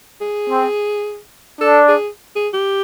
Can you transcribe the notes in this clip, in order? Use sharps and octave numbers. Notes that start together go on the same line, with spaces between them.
G#4
C4
D4 A4
G#4
G#4
G4